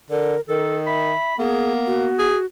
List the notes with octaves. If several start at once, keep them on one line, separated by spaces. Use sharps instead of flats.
D3 A#4
D#3 A4 A#4
E5 B5
A#3 B3 G#4
F#4
G#4